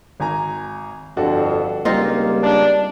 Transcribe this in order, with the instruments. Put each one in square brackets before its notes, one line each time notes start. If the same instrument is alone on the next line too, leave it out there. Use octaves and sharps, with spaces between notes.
[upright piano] G#1 G#5 A#5
[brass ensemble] G1 F2 [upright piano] D4 F#4 A4
[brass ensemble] C#2 G3 A#3 [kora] C4 D#4 F4
[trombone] D4